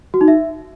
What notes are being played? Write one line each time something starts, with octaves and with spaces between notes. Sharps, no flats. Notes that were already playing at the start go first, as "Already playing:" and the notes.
F#4
D#4
E5